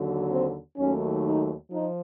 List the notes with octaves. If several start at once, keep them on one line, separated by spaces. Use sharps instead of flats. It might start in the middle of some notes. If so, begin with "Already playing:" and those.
Already playing: D#2 D3 F#3
C4
D#2 D#3 F#3 A3 C#4
D#4
F3 D#4